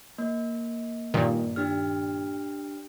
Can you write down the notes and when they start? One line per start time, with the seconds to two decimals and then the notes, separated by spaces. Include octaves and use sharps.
0.18 A#3
1.14 G2 A#2 D#3
1.56 D4 G4 F6